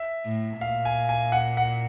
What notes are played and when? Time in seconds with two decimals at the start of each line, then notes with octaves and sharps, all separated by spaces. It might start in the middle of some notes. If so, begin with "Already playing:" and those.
Already playing: E5
0.25 A2
0.61 A#2 F5
0.85 G#5
1.09 G#5
1.32 F#5
1.57 F#5